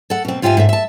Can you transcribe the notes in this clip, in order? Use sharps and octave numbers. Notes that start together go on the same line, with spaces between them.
A4 F#5
B2 C4
G#2 F4 G4 E5 F5 G#5
G#2 A4 E5
E5 A5